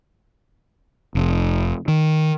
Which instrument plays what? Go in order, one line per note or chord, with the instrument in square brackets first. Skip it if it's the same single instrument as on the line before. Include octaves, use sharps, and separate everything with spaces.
[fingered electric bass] F1
D#3